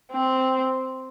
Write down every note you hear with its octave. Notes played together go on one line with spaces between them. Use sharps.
C4